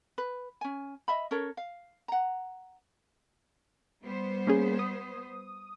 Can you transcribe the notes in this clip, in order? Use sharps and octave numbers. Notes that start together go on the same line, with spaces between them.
B4
C#4 G#5
D#5 E5 B5
C#4 A4 A#4 C#5
F5
F#5 A#5
G3 B3 C5
A#3 C#4 G#4
D#6